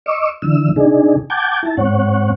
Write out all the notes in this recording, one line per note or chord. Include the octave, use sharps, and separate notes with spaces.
D#5 C#6 D6 E6
D3 E3 E6
C3 D4 D#4 G#4
F#5 G5 A5 D6 G6 G#6
E4 A5
G#2 C4 C#5 F#5